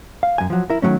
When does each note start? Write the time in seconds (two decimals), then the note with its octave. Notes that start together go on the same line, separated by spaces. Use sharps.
0.23 F5
0.38 F#2 G#5
0.50 F3 F#3
0.70 E4 A#4
0.82 D#3 E3 F#3 A3 C#4